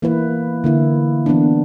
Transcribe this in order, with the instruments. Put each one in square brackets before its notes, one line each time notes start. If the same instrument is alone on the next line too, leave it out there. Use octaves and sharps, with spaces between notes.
[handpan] E3 A#3 E4 B4
D3 A#3 E4
E3 B3 D4